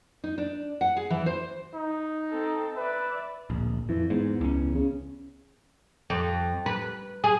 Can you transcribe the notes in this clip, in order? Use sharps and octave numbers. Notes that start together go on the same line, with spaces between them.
D#4
D4
F#5
G#4
E3
C5
D#4
C4 A4
B4 D5 E5
D1 A#1
F2 E3
E2 G#2
C#2 C#4
C#3
F2
B4
G#4